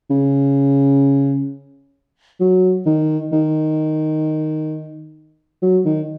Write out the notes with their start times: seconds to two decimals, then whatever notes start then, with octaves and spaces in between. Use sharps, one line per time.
0.10 C#3
2.40 F#3
2.86 D#3
3.32 D#3
5.62 F#3
5.85 D#3